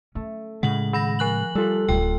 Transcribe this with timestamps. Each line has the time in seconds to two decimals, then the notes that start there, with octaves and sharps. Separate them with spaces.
0.15 A3 C#4
0.63 A2 C#3 G#3 F#5 F#7
0.93 D#3 B5 A#6
1.19 F3 F#6 F#7
1.55 G3 F4 A4
1.88 D1 F4 G5